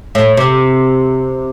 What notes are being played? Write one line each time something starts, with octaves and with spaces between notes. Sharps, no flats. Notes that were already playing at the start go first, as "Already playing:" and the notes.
A2
C3